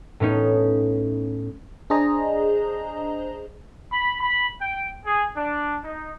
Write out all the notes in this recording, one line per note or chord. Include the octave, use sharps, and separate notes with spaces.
A2 B3 C#4 D#4
D4 G#4 C5 D#5 A#5
B5
B5
G5
G#4
D4
D#4